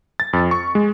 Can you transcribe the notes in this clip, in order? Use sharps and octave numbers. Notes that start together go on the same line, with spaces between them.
A6
F2
C#6
G#3